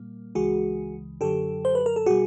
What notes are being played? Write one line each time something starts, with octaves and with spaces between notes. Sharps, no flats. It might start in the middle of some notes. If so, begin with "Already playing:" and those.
Already playing: A#2 G3 A#3
C#2 C#3 E3 G#3 F#4 G#4
F#2 D3 F#3 G4 A4
C5
B4
A#4
A4
B2 G3 F#4 G#4